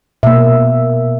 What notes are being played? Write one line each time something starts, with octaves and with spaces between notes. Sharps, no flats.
B2 A#3 E5